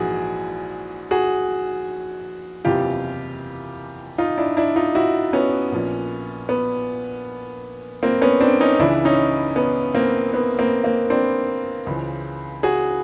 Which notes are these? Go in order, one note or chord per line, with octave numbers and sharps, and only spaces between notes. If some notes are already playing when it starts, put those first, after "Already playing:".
Already playing: A#1 G#2 E3 F#4 G#4
F#4 G#4
F#1 E2 C3 E3 F4 G4
D#4 F4
D4 E4
D4 E4
D#4 F4
E4 F#4
B3 C#4
A#1 A#2
B3
A#3 C4
B3 C#4
C4 D4
C#4 D#4
C#2 C#3 E3 D4 E4
C#4 D#4
B3 C#4
A#3 C4
B3
A#3 C4
A#3 C4
C4 D4
C#2 C#3 E3
F#4 G#4